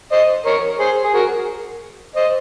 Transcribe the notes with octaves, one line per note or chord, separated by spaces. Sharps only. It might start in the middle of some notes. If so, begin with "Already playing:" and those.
C5 D#5
A#4 C#5
G#4 C5
G#4
F#4 A#4
C5 D#5